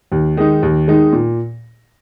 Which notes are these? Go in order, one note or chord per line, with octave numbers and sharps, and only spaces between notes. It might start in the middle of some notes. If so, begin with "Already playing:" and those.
D#2
D#3 G#3 D#4
D#2
D#3 G#3 D#4
A#2